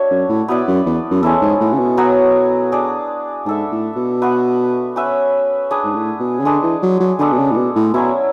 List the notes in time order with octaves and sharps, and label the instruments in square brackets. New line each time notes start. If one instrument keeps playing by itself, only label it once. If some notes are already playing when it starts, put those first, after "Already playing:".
Already playing: [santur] D4 F#4 C#5 E5
[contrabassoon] F#2
A2
[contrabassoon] B2 [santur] B3 E4 B4 D5
[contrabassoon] F#2
E2
F#2
[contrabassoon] E2 [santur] G#3 C#4 E4 A4
[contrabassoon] G#2
A2
C#3
B2
[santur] F#3 B3 F#4 C#5
D4 G#4 D5
[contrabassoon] G#2 [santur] D4 A4 E5
[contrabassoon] A2
B2
[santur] B3 F#4 B4 E5
C#4 F#4 B4 E5
D4 G#4 B4
[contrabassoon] G#2
A2
B2
C#3
[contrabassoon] D3 [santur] G#3 D4 G#4 B4
[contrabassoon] E3
F#3
F#3
[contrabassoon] D3 [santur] G#3 B3 D4 A4
[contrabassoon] B2
C#3
A2
B2
A2
[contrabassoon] B2 [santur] F#3 C#4 E4